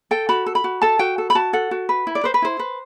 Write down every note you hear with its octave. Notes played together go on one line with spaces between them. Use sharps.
A4 G5
F#4 B5
A4
B5
F#4
A4 A5
F#4 G5
A4
B5
F#4 A5
A4 F#5
F#4
B4
E4
D5
B4 C5
B4
E4 C5
B4